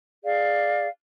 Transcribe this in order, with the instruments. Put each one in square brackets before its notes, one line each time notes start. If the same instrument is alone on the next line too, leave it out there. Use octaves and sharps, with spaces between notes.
[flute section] G#4 D5 F5